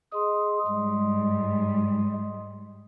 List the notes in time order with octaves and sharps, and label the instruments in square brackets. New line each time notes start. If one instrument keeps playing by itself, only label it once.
[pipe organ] G#4 [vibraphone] D#5 C6 D#6
[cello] G#2 G3 [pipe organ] G#3